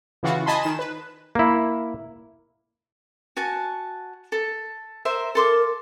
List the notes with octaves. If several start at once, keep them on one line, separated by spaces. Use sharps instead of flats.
C#3 E3 F4 F#4
D#5 G#5 A5 B5 C6
D#3 E7
B4
A#3 E4
F#4 G#5 A5
A4
A#4 C5 E5
A4 A#4 C6 D6